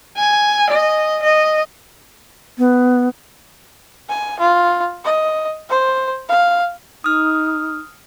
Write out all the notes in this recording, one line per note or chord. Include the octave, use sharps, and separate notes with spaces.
G#5
D#5
D#5
B3
G#5
F4
D#5
C5
F5
D#4 D#6 F6